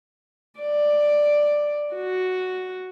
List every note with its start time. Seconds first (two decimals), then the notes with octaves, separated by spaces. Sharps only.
0.60 D5
1.94 F#4